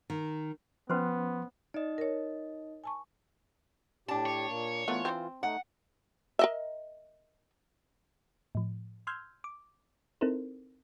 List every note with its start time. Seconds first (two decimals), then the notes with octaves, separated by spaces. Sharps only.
0.10 D#3
0.90 F3 B3 C#4 B4 C5 C6
1.74 D#4 D5 D#5
1.98 A#4 C#5
2.84 G#5 A5 C#6
4.08 A2 D4 G4 A5
4.26 C#5
4.50 A#2 A#3
4.88 E3 A3 B3 F4 A#4
5.05 C4
5.43 A3 D#4 F#5
6.39 A#4 D#5 E5
8.55 A2 F3
9.07 C6 E6 F6 G6 G#6
9.44 D6
10.21 C4 D#4 E4 A4 A#4 C5